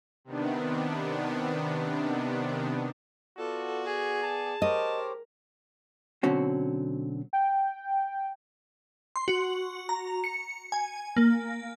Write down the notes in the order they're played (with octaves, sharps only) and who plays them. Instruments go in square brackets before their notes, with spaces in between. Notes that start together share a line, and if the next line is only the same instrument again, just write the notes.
[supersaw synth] C3 D#3 B3 D4
[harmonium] B3 F4 D5 [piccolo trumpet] F#4 [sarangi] A4
[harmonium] B3 D5 [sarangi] G#4
[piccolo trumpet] A5
[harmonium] G4 C5 C#5 [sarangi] A#4 [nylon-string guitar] D#5
[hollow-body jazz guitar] B2 D3 F#3 C4 C#4 F#4
[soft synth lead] G5
[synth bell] C6
F#4
A#5
C#7
G#5
A#3